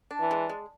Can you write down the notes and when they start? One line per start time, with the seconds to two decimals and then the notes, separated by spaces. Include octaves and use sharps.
0.11 D4
0.20 E3
0.31 G#3
0.49 G#3